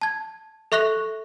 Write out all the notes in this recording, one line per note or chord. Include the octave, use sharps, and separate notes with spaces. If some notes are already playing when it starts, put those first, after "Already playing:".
A5 G#6
A4 E5 C#6 F#6 A#6 F7